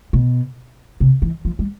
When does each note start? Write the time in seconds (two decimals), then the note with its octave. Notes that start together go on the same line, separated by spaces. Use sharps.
0.13 B2
1.00 C3
1.22 E3
1.45 F3
1.59 G3